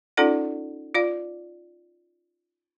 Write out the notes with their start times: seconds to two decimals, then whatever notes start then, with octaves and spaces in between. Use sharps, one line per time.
0.17 C#4 D#4 F4 A4 D5 F#5
0.94 F4 D5 F5